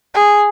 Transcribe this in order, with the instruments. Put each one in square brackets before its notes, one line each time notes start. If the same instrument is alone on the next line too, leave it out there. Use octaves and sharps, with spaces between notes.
[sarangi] G#4